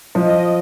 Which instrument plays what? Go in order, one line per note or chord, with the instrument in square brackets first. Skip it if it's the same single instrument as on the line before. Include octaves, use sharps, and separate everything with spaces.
[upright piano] F3 [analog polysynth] D#5